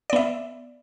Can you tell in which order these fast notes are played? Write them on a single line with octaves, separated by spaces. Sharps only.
D5 B3 E5